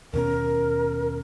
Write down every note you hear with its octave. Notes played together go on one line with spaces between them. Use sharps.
D#2 B2 C#4 A#4